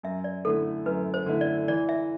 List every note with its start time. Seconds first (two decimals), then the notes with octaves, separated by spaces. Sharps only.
0.03 F#2 E5
0.24 D5
0.45 D3 A3 E4 A4
0.86 F#2 B4
1.14 C5
1.26 D3 A3 E4
1.41 D5
1.68 E3 D5
1.89 E5